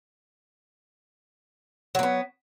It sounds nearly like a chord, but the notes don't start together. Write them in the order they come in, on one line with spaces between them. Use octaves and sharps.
F#3 A#3 B3